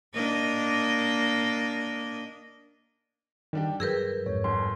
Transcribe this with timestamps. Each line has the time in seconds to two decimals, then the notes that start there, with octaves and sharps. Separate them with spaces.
0.14 A#3 D4 D#5
3.53 D#3 G3 D4 G4
3.80 G2 F#3 G#4 A#4 B4 E6 G6
4.26 F2 G#2 C#5
4.44 G1 C6